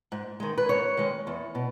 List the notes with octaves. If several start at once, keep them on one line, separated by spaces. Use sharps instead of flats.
G#2
D#3 G#3
B4
G#2 C#5
D#3 G#3
E2
B2